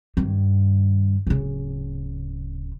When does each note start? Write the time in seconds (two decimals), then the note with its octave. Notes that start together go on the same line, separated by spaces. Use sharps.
0.17 G2 D#3
1.27 D1 C#3